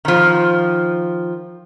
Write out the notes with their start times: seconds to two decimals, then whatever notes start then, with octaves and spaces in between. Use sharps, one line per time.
0.05 D#3 F3